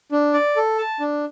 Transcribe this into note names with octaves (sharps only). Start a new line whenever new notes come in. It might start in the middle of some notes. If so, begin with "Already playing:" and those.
D4
D5
A4
A5
D4